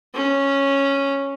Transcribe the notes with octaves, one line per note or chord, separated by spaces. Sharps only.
C#4